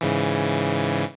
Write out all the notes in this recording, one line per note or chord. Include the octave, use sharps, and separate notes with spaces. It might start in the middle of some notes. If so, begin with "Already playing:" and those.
G#2 C#3 E3